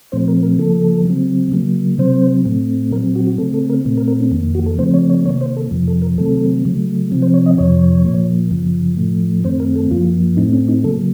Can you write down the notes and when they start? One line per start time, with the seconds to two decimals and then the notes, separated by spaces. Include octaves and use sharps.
0.12 A#2 F3 A3 C4 C5
0.28 A#4
0.43 A#4
0.59 C#3 F3 A#3 A4
1.05 C#3 F#3 C4
1.52 C#3 F#3 A#3
1.98 C3 F#3 C4 C5
2.45 A2 A3 C4
2.91 A#2 F#3 C4 A#4
3.15 F#4
3.27 F#4
3.38 C#3 A3 C4 A4
3.54 A4
3.70 A#4
3.85 A#2 A3 C4
3.97 A#4
4.08 A#4
4.20 C#4
4.31 F2 D#3 A#3
4.55 F#4
4.66 A4
4.78 C#3 F3 A3 C4 C5
4.94 C#5
5.09 C#5
5.25 C3 D#3 A#3 C#5
5.41 C5
5.57 A4
5.71 F2 C3 F3
5.88 A4
6.02 A#4
6.18 C3 D#3 F#3 A3 C4 A4
6.65 C#3 F#3 A3
7.12 C3 F3 C4
7.22 C5
7.34 C#5
7.46 D#5
7.58 F2 C3 F3 C#5
8.05 A#2 F3 A#3
8.51 F#2 C#3 F3
8.97 A2 F3 A3
9.44 F#2 D#3 A3 C4 C5
9.60 A#4
9.76 A4
9.91 F#2 F3 A#3 F4
10.37 A2 A3 C4 D#4
10.53 C#4
10.68 D#4
10.84 C#3 F#3 A#3 A4